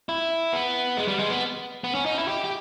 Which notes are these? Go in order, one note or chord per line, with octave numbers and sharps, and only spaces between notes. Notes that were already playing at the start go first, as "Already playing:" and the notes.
E4
B3
G#3
G3
G#3
B3
B3
C#4
D#4
E4
G4
G4